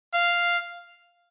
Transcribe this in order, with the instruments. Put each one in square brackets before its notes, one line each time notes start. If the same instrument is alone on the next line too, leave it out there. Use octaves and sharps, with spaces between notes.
[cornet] F5